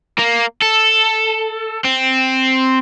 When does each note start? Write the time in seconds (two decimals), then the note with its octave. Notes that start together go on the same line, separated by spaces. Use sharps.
0.19 A#3
0.62 A4
1.85 C4